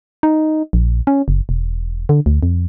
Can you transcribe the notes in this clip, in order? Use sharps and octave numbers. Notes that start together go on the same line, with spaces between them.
D#4
A#1
C#4
F#1
E1
D3
D2
F2